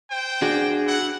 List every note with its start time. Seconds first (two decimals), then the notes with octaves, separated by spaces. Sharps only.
0.11 C5 G5
0.42 D4 F#4 G#4
0.87 E4 F#5